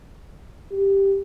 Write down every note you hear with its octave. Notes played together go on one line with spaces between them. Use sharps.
G4